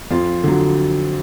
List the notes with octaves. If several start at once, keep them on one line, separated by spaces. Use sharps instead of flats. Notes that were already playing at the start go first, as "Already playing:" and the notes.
F2 F4
D3 F#3